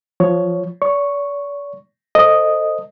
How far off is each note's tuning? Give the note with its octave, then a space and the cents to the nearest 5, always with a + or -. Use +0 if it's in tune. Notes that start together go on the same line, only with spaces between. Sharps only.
F3 +5 C#5 +10
D5 -45 C#6 +0
A4 +25 C5 +0 D#5 +0